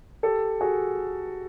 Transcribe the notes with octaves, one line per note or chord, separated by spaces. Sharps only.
G4 A4
F#4 G#4